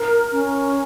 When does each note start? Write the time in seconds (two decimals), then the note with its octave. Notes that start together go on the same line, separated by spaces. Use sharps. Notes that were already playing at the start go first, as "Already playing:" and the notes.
Already playing: A#4
0.32 C#4